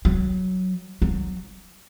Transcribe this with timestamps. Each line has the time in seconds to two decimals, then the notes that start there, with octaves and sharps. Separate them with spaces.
0.05 F#3
1.02 F#3